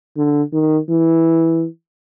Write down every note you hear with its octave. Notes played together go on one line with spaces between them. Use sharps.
D3
D#3
E3